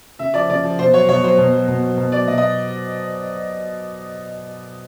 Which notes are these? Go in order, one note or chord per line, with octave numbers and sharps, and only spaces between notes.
C#3 E5
F3 D5
C#3 D5
F3
B2 C5
F#3 C#5
B2 C#5
F#3 C5
B2
F#3
B2
F#3
B2
F#3 D5
B2 D#5
D#5